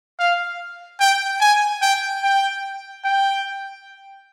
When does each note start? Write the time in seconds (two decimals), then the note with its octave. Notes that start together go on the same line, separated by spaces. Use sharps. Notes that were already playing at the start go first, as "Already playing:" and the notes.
0.19 F5
1.00 G5
1.41 G#5
1.82 G5
2.23 G5
3.04 G5